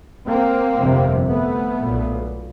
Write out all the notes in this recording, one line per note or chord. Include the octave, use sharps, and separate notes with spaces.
A#3 C4
G1 F2 C3
A3 B3
B1 A#2